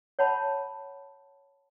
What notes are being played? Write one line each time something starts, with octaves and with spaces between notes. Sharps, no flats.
C#5 F#5 A5 B5